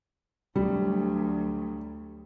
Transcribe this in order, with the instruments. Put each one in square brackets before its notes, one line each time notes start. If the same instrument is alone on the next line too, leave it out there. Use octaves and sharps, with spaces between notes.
[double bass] D2 F#3 [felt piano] G3